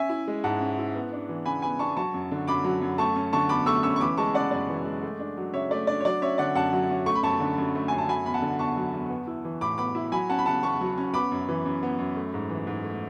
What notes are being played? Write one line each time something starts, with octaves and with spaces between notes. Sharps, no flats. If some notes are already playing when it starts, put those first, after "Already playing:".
Already playing: C#4 E5 G#5
E4
G#3
G#2 F#5 A5
C#4
E4
B3
D4
E3
C#3 G#5 B5
B3 G#5 B5
D4 A5 C#6
F#3 A5 C#6
F#2
D3
F#2 B5 D6
F#3
F#2
A3 A5 C#6
C#4
D3 A5 C#6
E2 B5 D6
A3 C#6 E6
C#4 C#6 E6
C#6
E3 B5 D6
G#3 A5 C#6
C#3 D5 F#5
F#2 D5
E3
G#3
A3
D4
F#3
C#3 C#5 E5
A3 D5
D4 D5
C#5
F#3 D5
C#4 C#5 E5
D3 D5 F#5
F#2 F#5 A5
F#3
C#4
A3 C#6
B5
F#2 A5 C#6
D3
F#2
A3
F#2 G#5
A5
F#3 G#5 B5
E2 B5
F#5 A5
D3
E2 A5 C#6
F#3
E2
B3
E4
E3
A2 B5 D6
B3 B5 D6
E4
F#3 G#5 B5
C#4 F#5 A5
B5
C#3 F#5 A5
E2 A5 C#6
F#3
C#4
B3 B5 D6
F#2
E3
F#2
B3
F#2
A3
G#2
E3
G#2
A3